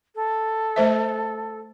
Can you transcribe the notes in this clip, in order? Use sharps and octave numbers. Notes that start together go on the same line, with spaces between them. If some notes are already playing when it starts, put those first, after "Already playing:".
A4
A3 C5 E5